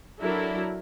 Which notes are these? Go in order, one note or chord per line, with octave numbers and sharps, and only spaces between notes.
F#3 D4 E4 A4 A#4